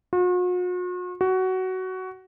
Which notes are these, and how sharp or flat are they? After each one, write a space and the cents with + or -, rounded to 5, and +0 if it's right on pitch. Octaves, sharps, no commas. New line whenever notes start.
F#4 -45
F#4 +15